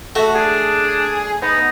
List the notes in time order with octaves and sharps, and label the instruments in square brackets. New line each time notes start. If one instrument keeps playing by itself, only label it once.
[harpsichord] A3 [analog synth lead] F#4
[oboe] D4 [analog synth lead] G#4
[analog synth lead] B3 [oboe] D#4